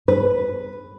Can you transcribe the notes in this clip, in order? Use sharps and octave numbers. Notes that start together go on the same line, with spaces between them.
B4